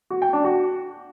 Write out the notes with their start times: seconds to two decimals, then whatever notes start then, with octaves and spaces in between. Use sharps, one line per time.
0.10 F#4
0.22 G5
0.33 D4
0.44 F#4